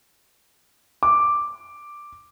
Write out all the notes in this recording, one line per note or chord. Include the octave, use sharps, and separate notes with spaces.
D6